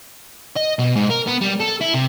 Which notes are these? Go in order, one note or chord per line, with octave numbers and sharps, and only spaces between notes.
D#5
B2
G#2
A#4
B3
G3
A4
E4
C3